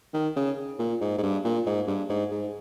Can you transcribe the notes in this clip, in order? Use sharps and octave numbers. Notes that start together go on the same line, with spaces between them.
D#3
C#3
A#2
G#2
G#2
G2
A#2
G#2
G2
G#2
G#2